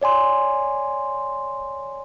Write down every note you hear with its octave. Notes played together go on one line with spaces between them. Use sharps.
C#5 D5 G#5 C6